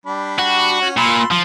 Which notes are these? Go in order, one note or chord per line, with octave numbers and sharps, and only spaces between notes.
G3 D4 B5
F#4
C#4 F#5
A#2 B5 C6 E6
F3 C6